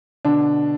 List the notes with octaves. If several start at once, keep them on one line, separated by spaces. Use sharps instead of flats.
B2 D3 D4